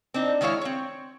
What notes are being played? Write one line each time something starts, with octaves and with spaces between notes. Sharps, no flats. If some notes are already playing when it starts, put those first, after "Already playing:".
C4 D4 D#4
D#3 G#3 E4 C#5 F5
C4 C#5